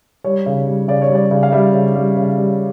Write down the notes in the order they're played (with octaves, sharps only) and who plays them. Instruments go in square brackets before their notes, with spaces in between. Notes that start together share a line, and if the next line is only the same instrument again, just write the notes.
[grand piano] G3 C#5
C#3
G3
C#3 D5
C#5
G3
D5
C#3
F5
G3 E5
C#3
G3
C#3
G3